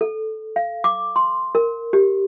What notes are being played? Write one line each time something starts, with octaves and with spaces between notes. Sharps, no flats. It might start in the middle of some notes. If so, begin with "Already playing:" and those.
A4
F5
D6
C6
A#4
G4